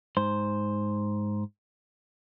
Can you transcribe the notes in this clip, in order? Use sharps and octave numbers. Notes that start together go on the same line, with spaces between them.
G#2 C5